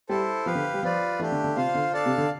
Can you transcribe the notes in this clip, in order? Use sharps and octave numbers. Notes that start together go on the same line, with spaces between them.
G3 E4 A4 C5
F3 G4 B4 F5
D3
G3
F3 F4 B4 D5
E3 A3 D4 G4
D3
D3
C3 F4 C5 F5
D3
D4 A4 D5 F5 A5
C3
D3